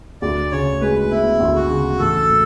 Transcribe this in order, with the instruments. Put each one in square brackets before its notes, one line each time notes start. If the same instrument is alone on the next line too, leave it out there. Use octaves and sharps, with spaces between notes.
[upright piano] D2 [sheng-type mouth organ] D5
[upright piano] C#3 [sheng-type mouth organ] C#5
[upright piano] G#3 [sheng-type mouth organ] B4
[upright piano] B3 [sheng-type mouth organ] E4
[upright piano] D2
[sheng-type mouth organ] F#4
[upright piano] C#3
[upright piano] A1 [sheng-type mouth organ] A4
[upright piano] A2